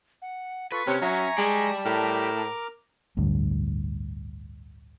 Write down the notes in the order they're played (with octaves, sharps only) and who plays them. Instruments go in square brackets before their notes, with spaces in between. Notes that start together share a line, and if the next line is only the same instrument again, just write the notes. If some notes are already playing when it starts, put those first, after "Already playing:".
[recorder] F#5
[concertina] F4 A4 [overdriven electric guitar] B4 [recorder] C#6
[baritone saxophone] C3 [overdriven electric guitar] C#4 [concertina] B4 [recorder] C#5
[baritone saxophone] F#3 [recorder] E5 [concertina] G#5 A#5 C#6
[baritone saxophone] G#3 [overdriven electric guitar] G4 D5 [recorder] A5
[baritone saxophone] A2 [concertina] A#4 D6 F6
[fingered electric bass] A1 D2 G2